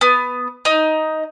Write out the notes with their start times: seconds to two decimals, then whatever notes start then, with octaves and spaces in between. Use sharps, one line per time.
0.01 B3
0.65 D#4